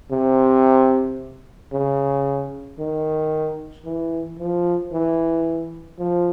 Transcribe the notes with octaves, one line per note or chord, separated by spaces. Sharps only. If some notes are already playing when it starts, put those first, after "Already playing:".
C3
C#3
D#3
E3
F3
E3
F3